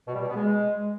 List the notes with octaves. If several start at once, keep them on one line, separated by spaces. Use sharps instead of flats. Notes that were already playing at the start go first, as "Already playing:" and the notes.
B2
G3
B2
B3
G#3